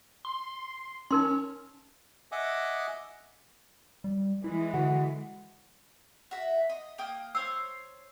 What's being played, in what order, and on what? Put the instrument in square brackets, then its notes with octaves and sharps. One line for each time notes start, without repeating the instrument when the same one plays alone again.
[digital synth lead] C6
[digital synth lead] C#4 [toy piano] D#4 A#4 C6
[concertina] D#5 E5 F#5 G#5 D6 D#6
[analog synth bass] G3
[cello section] E3 G#3 [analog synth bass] E4
[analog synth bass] D3 [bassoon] F#4
[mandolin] F#4 E5
D#5
A#3 G5 D#6
[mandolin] C5 C#5 [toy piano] E6